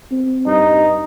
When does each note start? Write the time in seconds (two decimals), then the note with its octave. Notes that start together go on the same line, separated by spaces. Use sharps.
0.11 C4
0.46 G2 D#4